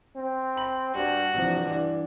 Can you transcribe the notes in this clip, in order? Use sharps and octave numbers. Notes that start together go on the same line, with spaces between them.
C4
B5 F#7
G2 F#4 G4
G2 C3 E3 F3
E3 D4